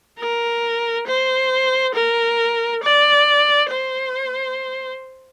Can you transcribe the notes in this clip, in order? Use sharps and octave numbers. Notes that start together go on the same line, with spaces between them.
A#4
C5
A#4
D5
C5